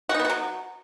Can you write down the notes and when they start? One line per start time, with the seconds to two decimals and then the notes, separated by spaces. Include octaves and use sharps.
0.09 F#4
0.14 D#4
0.19 B3
0.24 F#4
0.30 F#3